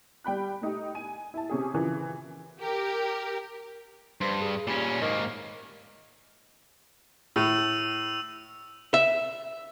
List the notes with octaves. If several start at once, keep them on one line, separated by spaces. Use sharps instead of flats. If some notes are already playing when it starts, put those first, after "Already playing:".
G3 G5 B5 F#6
A3 D#4 G4
G#5 D#7
E4 A5
C3 C#4 G#4
C#3 E3 F3
G4 A#4
G2 C5
G#4
A#2 G3 C#4
G#2 D#3 A#3
A2 E6 D#7 F7
E5